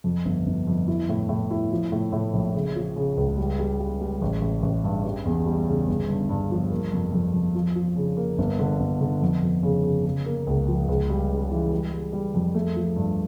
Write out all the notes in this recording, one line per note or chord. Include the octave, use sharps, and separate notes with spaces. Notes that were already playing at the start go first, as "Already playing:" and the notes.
F2
G1
G1
F2
E4
A2
A2
E4
F3
A2
A2
A#1
C#3
F3
C#3
C#2
G3
G3
G3
G3
A1
A1
A1
G2
G3
E2
G3
C#3
G1
G2
G2
F3
A#3
F2
F2
F2
F3
F3
C#3
A#3
G1
D3
G1
D3
F2
F2
C#3
C#3
C#3
A#3
C#2
F3
C#2
G3
C#3
E3
G3
G3
G3
F2
A3
F3
G2